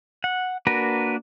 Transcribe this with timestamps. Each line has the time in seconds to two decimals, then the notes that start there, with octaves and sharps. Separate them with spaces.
0.24 F#5
0.67 A#3 D4 F#4 A#4 B4